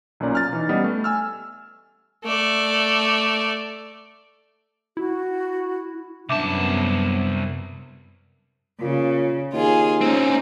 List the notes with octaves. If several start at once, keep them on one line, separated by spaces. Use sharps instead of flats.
B1 A#2 C#4 D5 A#5
F6 A6
E3 D#4
G3 B3 C#4 D#5
A3
G#5 E6 F6
A3 D5
E4 F#4
C2 F#2 B3 D4 E5 A5 D6
A#2 C#3
D#2 F4 G#4
C4 C#4 D#4